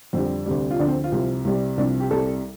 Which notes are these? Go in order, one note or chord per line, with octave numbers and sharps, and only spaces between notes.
F2 D3 G3 C4
D2 C3 G3
F4
D2 D3 F3 D4
C4
F4
C2 C3 F3
C2 C3 G3
C2 C3 F3 D4
G4
C2 C3 G3 A4